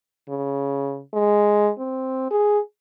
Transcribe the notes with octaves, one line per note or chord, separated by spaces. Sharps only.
C#3
G#3
C4
G#4